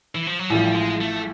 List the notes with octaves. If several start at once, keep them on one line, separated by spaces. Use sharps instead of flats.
E3
F3
F#3
A1 A2 F3 G3
G#3
A3